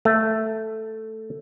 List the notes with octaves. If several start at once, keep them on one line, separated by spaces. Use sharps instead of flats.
A3